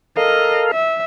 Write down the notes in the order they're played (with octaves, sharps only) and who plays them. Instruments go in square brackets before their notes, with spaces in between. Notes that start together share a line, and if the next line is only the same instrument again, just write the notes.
[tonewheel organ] A4 A#4 F5 [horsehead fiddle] D#5
[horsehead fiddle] E5